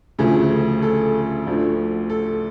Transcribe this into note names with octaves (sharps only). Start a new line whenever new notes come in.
D2 C#3 F3 A3 G#4
A4
D2 D3 F3 A3
A4